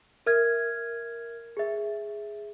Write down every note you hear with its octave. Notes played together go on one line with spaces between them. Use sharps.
A#4 E5 F6 G#6
G#4 E5